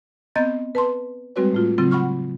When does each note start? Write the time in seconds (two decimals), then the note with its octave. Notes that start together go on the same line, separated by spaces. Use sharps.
0.36 B3 C4 D#5 A#5 G6 A6
0.75 B4 A5 C6
1.36 G3 G#3 C4 F#4 B4 C#5
1.53 A2 A3 F4
1.78 C#3 F#3 C4 F4 A6
1.91 F#5 B5 C#6 F6